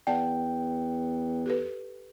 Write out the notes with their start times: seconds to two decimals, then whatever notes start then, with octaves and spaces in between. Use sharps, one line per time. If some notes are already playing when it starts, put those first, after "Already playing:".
0.07 E2 D5 F#5 G5 A5
1.46 G4 A4 B4